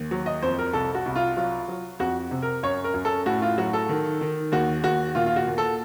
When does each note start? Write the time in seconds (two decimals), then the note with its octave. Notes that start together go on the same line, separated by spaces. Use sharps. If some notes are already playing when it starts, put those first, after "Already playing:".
Already playing: D#2
0.11 F#3
0.26 D#5
0.42 F2 C5
0.59 A#4
0.73 C2 A4
0.95 F#4
1.06 C2
1.16 F4
1.37 F#3 F4
1.68 F#3
1.99 F2 F#4
2.31 C3
2.42 A#4
2.63 F#2 C#5
2.84 A#4
2.94 F#2
3.05 A4
3.26 A2 F#4
3.42 F4
3.58 F#3 F#4
3.73 A4
3.89 D#3
4.21 D#3
4.52 D#2 F#4
4.84 D#2 F#4
5.15 A#2 F4
5.26 F4
5.36 F#4
5.47 A#2
5.58 A4